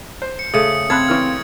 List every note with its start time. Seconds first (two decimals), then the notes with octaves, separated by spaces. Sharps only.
0.22 C5
0.39 C#7
0.54 C#3 A3 D#6 C#7
0.90 C4 F5 A5 B5 F#6 G#6
1.08 C#3 E3 F6